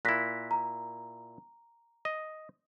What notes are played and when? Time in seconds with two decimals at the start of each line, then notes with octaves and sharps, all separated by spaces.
0.05 A#2 E4 F#6 A#6 B6
0.51 A#5
2.05 D#5